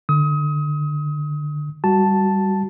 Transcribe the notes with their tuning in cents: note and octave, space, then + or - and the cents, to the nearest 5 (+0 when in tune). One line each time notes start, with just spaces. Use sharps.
D3 +20 D#6 +30
G3 +0 F#4 +10 A5 +0